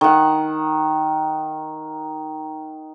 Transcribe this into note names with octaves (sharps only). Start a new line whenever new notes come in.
D#3 F#5